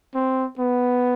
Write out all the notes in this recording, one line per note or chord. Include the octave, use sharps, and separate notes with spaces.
C4
B3